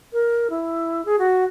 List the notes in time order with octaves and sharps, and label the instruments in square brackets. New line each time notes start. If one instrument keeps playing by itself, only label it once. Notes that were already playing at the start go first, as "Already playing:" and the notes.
[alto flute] A#4
E4
G#4
F#4